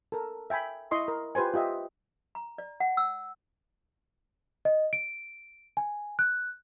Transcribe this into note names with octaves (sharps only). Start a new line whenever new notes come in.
A4 A#4
E5 G5 G#5 B5
E4 D#5 C6 C#6
A#4
F4 G4 B4 C5 G#5
F4 G4 D#5 E5
A#5
D5
F#5
E6
D#5
D7
G#5
F#6